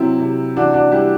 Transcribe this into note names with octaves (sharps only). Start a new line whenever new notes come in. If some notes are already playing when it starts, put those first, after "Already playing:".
Already playing: C3 F#3 C4 E4
C3
E3 D4 F#4
D4 F#4
G3 E4 G4